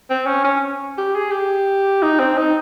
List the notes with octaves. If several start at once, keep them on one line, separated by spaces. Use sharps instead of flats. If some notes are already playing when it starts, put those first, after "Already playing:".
C4
C#4
C#4
G4
G#4
G4
D#4
C4
D#4